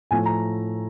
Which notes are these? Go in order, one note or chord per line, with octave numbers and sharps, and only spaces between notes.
A2 F3 A3 G#5
A#5